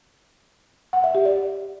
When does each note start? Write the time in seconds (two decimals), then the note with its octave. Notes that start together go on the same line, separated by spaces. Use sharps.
0.93 F#5
1.04 E5
1.15 G4
1.25 D5